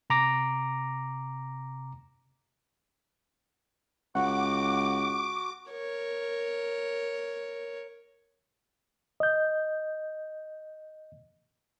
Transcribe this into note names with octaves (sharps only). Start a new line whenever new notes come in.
C3 A#5 D6 A#6
C#2 F#4 F#5 D6
A#4 C#5
D#5 G6